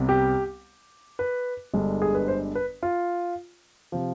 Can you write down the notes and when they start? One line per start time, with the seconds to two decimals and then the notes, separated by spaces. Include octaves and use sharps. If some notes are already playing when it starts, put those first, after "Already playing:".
Already playing: C2 C3 G3 B3
0.09 G4
1.19 B4
1.74 G1 G2 D3 G#3
2.02 G#4
2.15 B4
2.28 C5
2.55 B4
2.83 F4
3.92 C3 F3